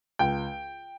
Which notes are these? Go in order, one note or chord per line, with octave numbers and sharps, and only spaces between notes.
C#2 G5